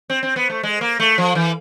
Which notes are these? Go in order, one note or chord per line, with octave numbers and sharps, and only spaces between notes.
C4
C4
B3
A3
G#3
A#3
A3
F3
E3